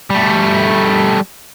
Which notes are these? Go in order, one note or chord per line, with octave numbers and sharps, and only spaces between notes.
G3 A3